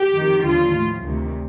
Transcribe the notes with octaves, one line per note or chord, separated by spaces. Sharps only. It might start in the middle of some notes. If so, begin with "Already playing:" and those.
Already playing: G4
F2 D#3
D#2 D3 F3 F4
A2 F3
D2 C3 D#3